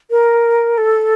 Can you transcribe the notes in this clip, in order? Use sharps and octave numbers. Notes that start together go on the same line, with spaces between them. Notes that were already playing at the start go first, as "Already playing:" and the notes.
A#4
A4